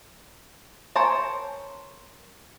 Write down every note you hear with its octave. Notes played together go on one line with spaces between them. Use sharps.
A#4 C5 C#5 G#5 A5